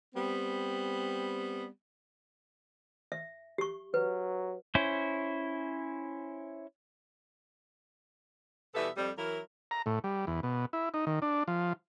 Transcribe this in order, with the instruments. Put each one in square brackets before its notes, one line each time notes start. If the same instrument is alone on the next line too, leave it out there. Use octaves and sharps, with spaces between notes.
[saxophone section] G3 B3 C4
[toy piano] E5
G4 C#6
[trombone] F#3 [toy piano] B4
[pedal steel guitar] C#4 E4 C5
[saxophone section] B2 E3 G3 B3 A4 E5
F2 G3
E3 F#3 E4 A#4
[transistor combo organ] A#5
A2
G3
E2
B2
E4
D#4
D#3
D4
F3